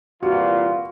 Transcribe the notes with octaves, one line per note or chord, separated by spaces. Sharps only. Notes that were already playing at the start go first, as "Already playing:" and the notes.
C2 A#2 E3 F4 F#4